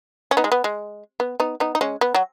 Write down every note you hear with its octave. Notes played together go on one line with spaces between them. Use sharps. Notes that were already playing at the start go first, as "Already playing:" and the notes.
C#4
B3 D#4
G#3
B3
G#3
B3
B3 D#4
B3 D#4
D#4
G#3 C#4
B3
F#3